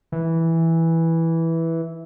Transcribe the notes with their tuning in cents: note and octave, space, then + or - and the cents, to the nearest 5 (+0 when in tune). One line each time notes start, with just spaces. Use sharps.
E3 -5